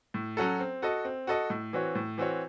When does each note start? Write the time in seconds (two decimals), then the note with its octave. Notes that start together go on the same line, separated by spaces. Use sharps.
0.14 A2
0.37 F#3 C#4 F#4 A4
0.60 C4
0.82 F#4 A4 D#5
1.05 C4
1.27 F#4 A4 D#5
1.50 A2
1.73 E3 C4 F#4 C#5
1.95 A2
2.18 E3 C4 F#4 C#5